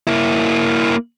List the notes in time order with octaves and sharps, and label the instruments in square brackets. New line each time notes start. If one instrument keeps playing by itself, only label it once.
[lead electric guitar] A#3 E4